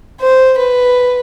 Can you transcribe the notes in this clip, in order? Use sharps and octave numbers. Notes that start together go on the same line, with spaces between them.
C5
B4